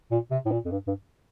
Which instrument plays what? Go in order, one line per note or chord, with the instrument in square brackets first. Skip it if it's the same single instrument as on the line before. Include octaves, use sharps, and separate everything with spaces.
[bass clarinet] A#2
C3
A2
A#2
F2
G2
G2